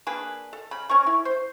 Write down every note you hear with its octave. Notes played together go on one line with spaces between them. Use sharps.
A#3 D4 G#4 B4
A4
C#3 B5
C#4 A#4 C#6
E4
C5